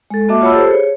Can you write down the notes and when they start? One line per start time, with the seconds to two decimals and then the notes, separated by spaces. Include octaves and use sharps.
0.10 G#3 A4
0.29 A#3 F#4 D#5 E5 A5 D6
0.41 F4 C#5 F#5 A5 B5 E6
0.53 G4 A4 C5
0.68 G#4 C#5